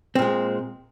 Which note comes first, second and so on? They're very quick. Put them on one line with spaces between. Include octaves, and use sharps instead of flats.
C4 A#2 G#3